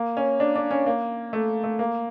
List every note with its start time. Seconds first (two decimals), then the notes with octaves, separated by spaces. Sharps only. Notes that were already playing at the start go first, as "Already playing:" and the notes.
Already playing: A#3
0.17 C#4
0.40 D4
0.56 D4
0.71 C#4
0.86 A#3
1.33 A3
1.64 A3
1.79 A#3